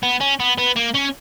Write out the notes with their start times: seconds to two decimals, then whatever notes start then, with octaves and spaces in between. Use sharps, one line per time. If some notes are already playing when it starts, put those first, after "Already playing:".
0.03 B3
0.20 C#4
0.40 B3
0.58 B3
0.76 A#3
0.94 C#4